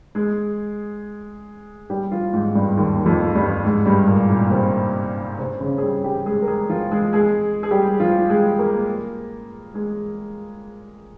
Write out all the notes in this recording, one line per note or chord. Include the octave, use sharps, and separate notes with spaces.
G#3 G#4
G3 G4
F3 F4
G#2 G#3
G2 G3
D#2 D#3
F2 F3
G2 G3
G#2 G#3
G2 G3
A#2 A#3
A#2 A#3
C3 C4
C3 C4
C#3 C#4
G#4
G3 G4
G3 G4
G#3 G#4
A#4
G#3 G#4
F3 F4
G#3 G#4
G#3 G#4
G#4
G3 G4
F3 F4
G#3 G#4
A#3 A#4
G#3 G#4